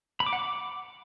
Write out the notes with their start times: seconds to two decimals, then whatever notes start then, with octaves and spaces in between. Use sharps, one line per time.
0.20 B5
0.26 D6
0.33 F#5
0.39 D6